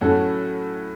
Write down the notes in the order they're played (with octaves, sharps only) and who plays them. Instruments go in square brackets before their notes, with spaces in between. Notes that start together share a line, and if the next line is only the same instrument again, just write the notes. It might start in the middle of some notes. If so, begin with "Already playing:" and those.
[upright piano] A2 F#3 C#4 F#4 A4